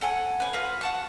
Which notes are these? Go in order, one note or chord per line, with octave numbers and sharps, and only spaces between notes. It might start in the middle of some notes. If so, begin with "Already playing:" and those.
A4 F#5 G#5 C#6
B4 C#5
F4 F#4 B4
F#5 A5 C#6